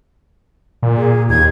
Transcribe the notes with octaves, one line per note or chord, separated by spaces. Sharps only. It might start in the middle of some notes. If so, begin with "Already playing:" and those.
A#2
G#4
D#2 G#6